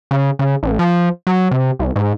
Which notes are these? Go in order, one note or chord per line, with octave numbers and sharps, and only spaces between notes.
C#3
C#3
A1
F3
F#3
C3
C2
G#2